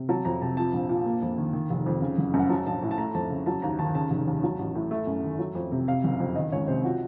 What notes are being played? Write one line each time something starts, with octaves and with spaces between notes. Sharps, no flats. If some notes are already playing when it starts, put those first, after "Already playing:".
Already playing: C3
F#3 A5
F2 A#5
C3 A5
F3 A5
A#1
A#2
A#3
F2
D#3
D#3
F1
F2
C#3
F#1
F#2
F#5
F#3 A5
A#1 A5
A2
A5
A3 A#5
F2 A5
C#3
F#3 A5
D#2 A#5
D#3 A5
C#3 A5
F1
D#2
F#3
A1
A2
A3
F#2
D#3
F#3
F2
C3
C3 F5
F#1
F2
D#3 D#5
C#2 C#5
C3 C5
F3 F#4